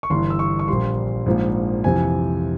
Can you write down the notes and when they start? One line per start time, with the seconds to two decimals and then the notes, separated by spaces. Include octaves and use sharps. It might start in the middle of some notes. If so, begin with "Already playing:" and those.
0.03 C#6
0.10 G1 G2 E3 C6
0.30 E6
0.39 C#6
0.59 C#6
0.68 A#1 A#2 G3 C6
1.26 A#1 G#2 F3 A#3
1.84 F2 C3 E3 G#5